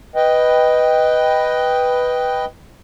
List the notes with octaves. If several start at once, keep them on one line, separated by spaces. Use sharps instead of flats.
B4 D#5 G5